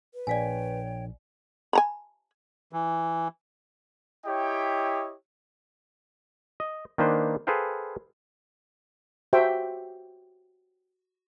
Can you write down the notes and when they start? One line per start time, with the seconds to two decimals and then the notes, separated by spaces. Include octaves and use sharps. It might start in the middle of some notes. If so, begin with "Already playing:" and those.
0.14 B4
0.27 A#1 C#5 D5 F5 G5 G#5
1.73 G#5 A#5 B5
2.73 E3
4.25 E4 G4 C#5 D#5 G5
6.60 D#5
6.98 D#3 A#3 D4 B4 C5
7.47 G#4 A4 B4 C5 F5 G5
9.33 F#4 G4 C5 E5 G5